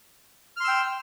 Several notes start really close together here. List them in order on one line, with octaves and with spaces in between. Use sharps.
F6 C6 E6 G5